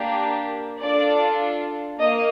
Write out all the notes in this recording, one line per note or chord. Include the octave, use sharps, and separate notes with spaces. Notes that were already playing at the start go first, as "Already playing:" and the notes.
Already playing: A#3 D4 G4
D4 F4 A4 D5
A#3 D#5